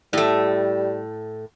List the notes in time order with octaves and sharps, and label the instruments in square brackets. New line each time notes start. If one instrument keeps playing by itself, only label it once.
[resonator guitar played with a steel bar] A2 A3 [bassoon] G3